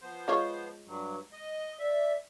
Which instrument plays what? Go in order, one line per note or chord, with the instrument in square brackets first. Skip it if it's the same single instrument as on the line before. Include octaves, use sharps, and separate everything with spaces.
[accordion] F3 B3 C5
[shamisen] G#3 F4 C#5
[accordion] G2 F#3
D#5
[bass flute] D5 [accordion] E5